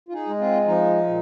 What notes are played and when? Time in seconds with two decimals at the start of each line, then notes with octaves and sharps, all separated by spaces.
0.09 F4
0.13 D#4 G#4
0.27 G#3
0.39 C4 F4
0.66 F3 D#4
1.07 A#2